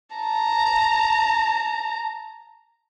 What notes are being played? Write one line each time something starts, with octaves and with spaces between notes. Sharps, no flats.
A5 A#5